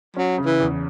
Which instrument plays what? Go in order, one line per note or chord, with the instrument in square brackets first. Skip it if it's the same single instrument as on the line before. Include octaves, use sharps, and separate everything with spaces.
[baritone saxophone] F#3 [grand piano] C#4
[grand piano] C#3
[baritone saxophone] E3
[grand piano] E2